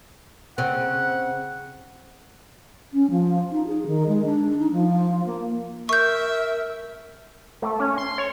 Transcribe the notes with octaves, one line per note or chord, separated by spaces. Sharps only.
C#3 C4 F#5
C#4
F3
D#4
G#4
D#3
G#3
D4
D#4
F3
A#3
A#4 E5 C#6 G6
A3
C#4
C6
C#5